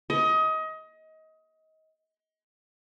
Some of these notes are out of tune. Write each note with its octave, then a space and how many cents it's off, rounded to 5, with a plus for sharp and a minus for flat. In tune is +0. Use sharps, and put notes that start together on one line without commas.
D#5 +25